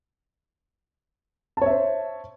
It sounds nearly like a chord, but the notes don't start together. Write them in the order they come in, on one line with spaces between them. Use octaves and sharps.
A5 C#5 E5 C5